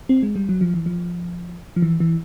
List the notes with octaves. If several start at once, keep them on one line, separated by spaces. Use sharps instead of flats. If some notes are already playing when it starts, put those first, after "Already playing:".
C4
G#3
G3
F#3
F3
E3
F3
F3
E3
E3